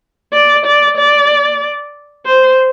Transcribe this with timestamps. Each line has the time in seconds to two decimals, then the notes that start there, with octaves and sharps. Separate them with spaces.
0.34 D5
0.66 D5
0.97 D5
2.26 C5